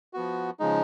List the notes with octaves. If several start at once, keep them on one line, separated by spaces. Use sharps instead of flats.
F3 B3 F#4
C#3 F3 G#3 D#4